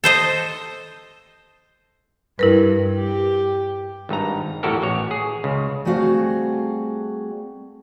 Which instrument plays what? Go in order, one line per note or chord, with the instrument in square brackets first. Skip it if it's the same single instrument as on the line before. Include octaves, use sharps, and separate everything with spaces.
[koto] A4 C5 D#5
[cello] G2 [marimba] E4 A#4 B4
[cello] G4
[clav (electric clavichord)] G#1 G2 D#4 A#5
E2 A2 F#4 G4 A4 A#4
A1 F#4 C#5
G#4
C#2 C#3
[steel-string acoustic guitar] G3 A3 C4 F#4 G#4 F5